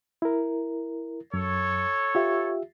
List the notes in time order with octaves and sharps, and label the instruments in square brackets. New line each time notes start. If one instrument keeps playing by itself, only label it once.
[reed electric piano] E4 A#4
[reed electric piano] F#2 [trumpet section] A4 C#5
[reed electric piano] F4 G4 E5